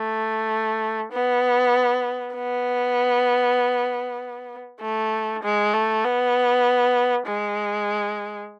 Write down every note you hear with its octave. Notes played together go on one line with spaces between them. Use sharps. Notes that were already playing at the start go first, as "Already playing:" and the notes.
Already playing: A3
B3
B3
A3
G#3
A3
B3
G#3